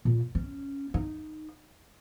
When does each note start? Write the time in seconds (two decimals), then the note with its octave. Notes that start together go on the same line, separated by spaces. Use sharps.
0.05 A#2
0.35 C#4
0.94 D#4